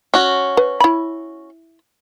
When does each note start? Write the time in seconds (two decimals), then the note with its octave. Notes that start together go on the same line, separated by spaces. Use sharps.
0.14 C#4 F#4
0.57 B4
0.80 E4 B5